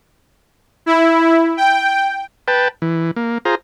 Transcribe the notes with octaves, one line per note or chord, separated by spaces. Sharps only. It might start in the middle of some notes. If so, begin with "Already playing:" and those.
E4
G5
B4 G5 A5
E3
A#3
F4 G#4 C5 A#5